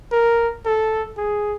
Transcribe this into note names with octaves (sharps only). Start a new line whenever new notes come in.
A#4
A4
G#4